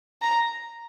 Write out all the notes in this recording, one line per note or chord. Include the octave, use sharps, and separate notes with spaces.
A#5